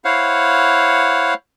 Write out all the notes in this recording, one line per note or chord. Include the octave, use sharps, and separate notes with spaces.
E4 C5 C#5 F5 F#5